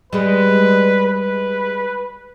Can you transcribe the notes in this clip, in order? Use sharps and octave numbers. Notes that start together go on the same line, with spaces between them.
G3 G#3 B4
B4